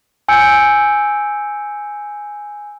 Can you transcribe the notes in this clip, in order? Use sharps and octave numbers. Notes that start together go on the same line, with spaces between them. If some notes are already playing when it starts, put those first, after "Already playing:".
G#5 E6 G6 C#7 D7